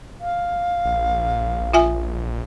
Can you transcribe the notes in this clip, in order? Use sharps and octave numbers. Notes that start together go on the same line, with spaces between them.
F5
A#1
F4 E5 G#5